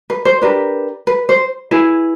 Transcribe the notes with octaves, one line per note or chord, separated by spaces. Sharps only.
B4
C5
D4 G4 A#4 B4
B4
C5
E4 G#4 B4